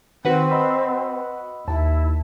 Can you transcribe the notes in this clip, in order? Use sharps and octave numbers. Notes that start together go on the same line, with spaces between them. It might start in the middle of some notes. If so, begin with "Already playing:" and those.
D#3 C4 F#4 B4 F#5
D#5 B5 E6
D#2 E4 A5